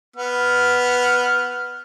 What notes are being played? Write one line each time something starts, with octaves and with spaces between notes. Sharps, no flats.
B3 F6